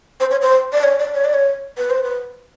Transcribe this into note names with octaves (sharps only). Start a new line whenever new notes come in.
C5
C#5
C5
D5
C#5
D5
C#5
D5
C#5
B4
C5
B4